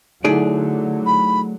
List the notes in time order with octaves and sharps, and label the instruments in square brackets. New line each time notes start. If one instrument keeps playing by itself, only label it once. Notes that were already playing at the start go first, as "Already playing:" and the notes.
[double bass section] D3 F#3 [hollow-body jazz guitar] A3 G#4 D5 [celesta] D#4 E4
[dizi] B5